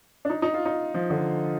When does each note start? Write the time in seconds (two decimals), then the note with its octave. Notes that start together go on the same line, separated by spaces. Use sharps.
0.25 D4
0.30 D#4
0.42 D#4
0.54 F4
0.66 D#4
0.94 F3
1.10 D3